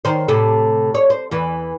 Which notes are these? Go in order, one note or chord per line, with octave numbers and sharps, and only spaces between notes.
D#3 C5
A2 C3 A4
C#5
C5
E2 E3